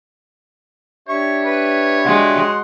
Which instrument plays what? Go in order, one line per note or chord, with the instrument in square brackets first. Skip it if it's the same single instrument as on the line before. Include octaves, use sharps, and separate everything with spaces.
[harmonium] D4 G4 E5 [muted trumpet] C#5 [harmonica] C#6
[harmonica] B4
[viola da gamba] G#3 [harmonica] F#4 F#5 C6